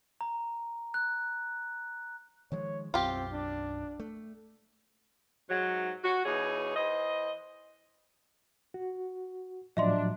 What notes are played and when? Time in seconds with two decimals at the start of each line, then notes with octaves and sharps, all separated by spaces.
0.21 A#5
0.94 F#6
2.52 D#3 F3 G#3 C#5
2.94 B1 F#2 C4 F4 G4
3.33 D4
4.00 A3
5.50 G#2 F#3
6.04 F#4
6.25 B2 E3 D#4 G#4 C#5
6.76 E3 C5 D#5
8.74 F#4
9.77 A2 F3 F#3 D4 D#5 E5 C6